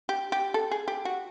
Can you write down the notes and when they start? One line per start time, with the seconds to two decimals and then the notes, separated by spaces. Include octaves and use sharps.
0.09 G4
0.32 G4
0.54 A4
0.71 G#4
0.88 G4
1.05 F#4